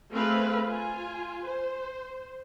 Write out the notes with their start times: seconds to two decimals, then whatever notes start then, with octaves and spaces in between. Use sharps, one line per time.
0.11 A3 C4 G#4 B4 F5
0.65 F4 G#5
1.44 C5